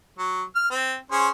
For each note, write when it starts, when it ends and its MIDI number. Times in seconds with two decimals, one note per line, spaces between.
0.18 0.42 54
0.55 0.69 89
0.70 0.96 60
1.11 1.28 61
1.11 1.28 68
1.11 1.28 72